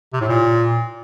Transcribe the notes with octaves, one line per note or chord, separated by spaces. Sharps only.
C3
A2
A#2